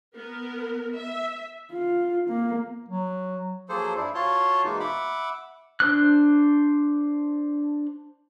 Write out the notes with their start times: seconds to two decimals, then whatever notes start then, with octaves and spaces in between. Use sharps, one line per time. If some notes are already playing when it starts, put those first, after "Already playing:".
0.15 B3 A#4
0.95 E5
1.72 F4
2.29 A#3
2.88 F#3
3.69 F3 F#3 A#3 G#4 A4 C5
3.96 G2 G3 E4
4.15 F4 F#4 C#5 A5 C6
4.64 B2 E3 G#3 A#3 D#4
4.80 E5 F#5 B5 D6
5.80 D4 C5 F#6